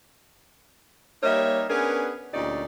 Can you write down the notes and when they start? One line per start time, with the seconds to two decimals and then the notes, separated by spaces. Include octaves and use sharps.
1.23 G3 A#3 D#4 A#4 C#5 E5
1.70 B3 C#4 D4 G#4 A#4 B4
2.33 D2 A#2 C#4 D#4 G4 D5